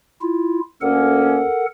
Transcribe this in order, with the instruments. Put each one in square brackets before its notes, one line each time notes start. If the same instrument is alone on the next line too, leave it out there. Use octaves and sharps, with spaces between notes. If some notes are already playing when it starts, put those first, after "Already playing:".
[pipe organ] E4 F4
[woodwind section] D2 A#3 C#4 [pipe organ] A4 A#4 F#5